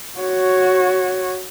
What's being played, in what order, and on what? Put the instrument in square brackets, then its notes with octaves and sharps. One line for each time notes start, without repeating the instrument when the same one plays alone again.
[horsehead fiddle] F#4 C#5